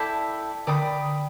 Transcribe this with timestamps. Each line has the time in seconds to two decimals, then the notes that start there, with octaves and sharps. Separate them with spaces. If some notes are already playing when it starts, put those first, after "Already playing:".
Already playing: E4 A4 D5 G5
0.67 D3 D5 G5 B5 D#6